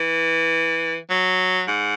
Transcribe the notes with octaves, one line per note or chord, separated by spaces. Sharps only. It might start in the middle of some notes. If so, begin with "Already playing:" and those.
Already playing: E3
F#3
G#2